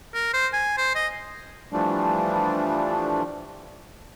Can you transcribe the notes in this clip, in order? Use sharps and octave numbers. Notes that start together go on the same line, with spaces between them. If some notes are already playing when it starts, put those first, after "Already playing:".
A#4
C5
G#5
C5
D#5
E3 F3 G3 A3 D4